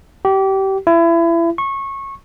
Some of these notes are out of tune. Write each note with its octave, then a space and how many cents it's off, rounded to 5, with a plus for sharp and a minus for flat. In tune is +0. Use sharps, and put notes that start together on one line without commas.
G4 -25
E4 +30
C#6 -20